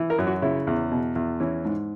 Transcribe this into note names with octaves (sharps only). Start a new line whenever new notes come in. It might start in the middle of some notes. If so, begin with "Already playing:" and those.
Already playing: E3
A#4
F#2
F#4
C#3 E4
E2
B2
E2
E3 C#4
G#2